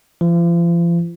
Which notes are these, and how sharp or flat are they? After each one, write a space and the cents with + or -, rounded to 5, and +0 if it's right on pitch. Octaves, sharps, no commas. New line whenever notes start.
F3 -40